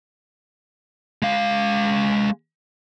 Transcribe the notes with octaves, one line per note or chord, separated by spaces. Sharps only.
G#3 F5